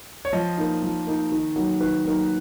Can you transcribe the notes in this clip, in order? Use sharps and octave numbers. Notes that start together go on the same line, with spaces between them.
C#5
F3 D#5
A#3 D#4
F3
A#3 D#4
D#3
F#3 A#3 D#4
D#3 B4
F#3 A#3 D#4